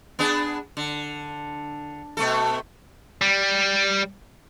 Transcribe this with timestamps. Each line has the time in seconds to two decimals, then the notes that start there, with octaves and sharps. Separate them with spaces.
0.19 B3 D4 G#4
0.77 D3
2.17 B2 A3 A4
3.22 G3